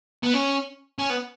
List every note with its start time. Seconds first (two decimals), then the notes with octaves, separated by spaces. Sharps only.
0.23 B3
0.34 C#4
0.99 C#4
1.10 B3